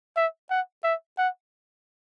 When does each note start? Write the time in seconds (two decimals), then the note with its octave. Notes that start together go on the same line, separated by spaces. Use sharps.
0.16 E5
0.50 F#5
0.84 E5
1.18 F#5